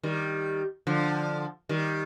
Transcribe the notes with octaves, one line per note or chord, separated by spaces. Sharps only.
D#3 G3
D3 F3
D#3 G3